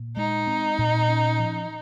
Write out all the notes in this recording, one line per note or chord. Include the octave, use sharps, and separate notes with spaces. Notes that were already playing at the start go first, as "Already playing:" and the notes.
Already playing: A#2
G#3 D#4
C4
A#2
C#4
F3